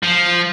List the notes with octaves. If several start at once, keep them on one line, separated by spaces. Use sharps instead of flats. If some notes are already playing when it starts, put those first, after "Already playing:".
F3